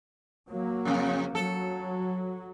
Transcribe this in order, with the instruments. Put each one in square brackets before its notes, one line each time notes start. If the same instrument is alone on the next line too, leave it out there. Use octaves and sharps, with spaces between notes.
[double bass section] F#3 A#3
[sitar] F2 C#3
[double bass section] F#3 [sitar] A4